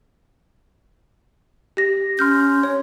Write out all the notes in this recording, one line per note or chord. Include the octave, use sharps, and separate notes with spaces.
G4 A#6
C#4 C6 F6 G6
C#5